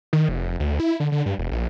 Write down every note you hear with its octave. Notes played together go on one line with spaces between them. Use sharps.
D#3
F1
D2
E4
D3
D3
G2
E1
A#1